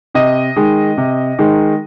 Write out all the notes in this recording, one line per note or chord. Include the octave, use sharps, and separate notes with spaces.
C3 D#5
D#3 G#3
C3
D#3 G#3